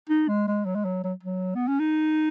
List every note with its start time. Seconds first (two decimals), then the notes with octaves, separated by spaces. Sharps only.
0.09 D#4
0.28 G#3
0.48 G#3
0.66 F#3
0.75 G#3
0.85 F#3
1.04 F#3
1.23 F#3
1.55 B3
1.68 C#4
1.80 D#4